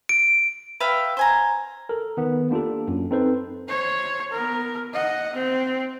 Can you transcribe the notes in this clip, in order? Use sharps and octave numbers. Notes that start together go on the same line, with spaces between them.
D7
B4 E5 F5 G5
C5 G#5 A#5
A4 A#4
D#3 B3
A#3 D4 F4 G4 A4
F#2
C4 D#4 A4 B4 C5
C5 C#5
B3 A#4
D#5 F#5
C4